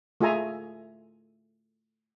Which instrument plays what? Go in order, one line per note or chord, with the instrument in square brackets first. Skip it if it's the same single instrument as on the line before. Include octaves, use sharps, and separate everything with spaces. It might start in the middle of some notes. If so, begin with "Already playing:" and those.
[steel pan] A3 F4 G#4 E5 G#5 A#5